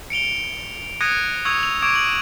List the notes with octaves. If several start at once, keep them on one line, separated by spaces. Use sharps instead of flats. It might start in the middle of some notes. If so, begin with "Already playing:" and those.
C#7 D7 F7 G7
D#6 F#6 G#6 A#6 C#7 D#7
C#6 D#6 E6 G#6 C#7 F7
E6 F7
C#6 D6 G#6 D7
D#7 F#7